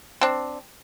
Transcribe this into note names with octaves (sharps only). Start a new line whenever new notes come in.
C4 D4